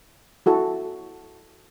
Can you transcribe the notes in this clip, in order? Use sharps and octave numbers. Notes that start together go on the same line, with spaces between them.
E4 F#4 A4